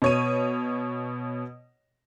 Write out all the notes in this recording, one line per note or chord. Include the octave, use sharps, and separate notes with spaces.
B2 C#5 D#7